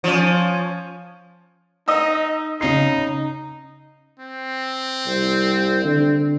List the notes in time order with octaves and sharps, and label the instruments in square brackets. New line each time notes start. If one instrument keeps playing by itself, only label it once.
[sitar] F3 C#4
[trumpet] D#4 [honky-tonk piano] D#5 D#6 E6
[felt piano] C#3 C7 [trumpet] D#4
[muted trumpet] C4
[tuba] C2
D3